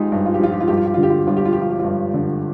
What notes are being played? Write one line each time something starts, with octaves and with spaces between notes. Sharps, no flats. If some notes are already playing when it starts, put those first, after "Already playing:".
Already playing: G#1 F3 G#3 D#4 F4 G4
G2
F4
G4
F3 F4
G4
F4
G2 G4
F4
G4
F4
D3
G4
F4
G4
G1 F4
G4
F4
F3 G4
F4
G4
F4
G2
D3